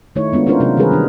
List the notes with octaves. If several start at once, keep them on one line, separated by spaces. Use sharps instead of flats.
D#3 A3 D#4 E4 C#5
G#3 B3 D4 F4
C#4 D4 E4 F4 A#4 C5
C3 F#3 F4 A#4
D#3 E3 G3 G#4 A#4 B4
D#3 D4 D#4